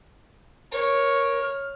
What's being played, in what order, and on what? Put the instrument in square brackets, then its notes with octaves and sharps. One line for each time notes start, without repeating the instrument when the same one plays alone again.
[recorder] A#4 [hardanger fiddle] C#5
[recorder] F6